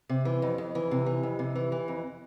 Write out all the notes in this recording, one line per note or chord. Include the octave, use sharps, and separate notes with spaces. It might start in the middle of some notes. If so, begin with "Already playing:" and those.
C3
E3
F2
F2
E3
C3
E3
F2
C3
E3
E3
F2